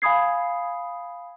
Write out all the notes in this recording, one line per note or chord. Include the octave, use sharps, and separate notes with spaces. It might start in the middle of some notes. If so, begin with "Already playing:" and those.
F5 G#5 B5 D#6 G#6 C7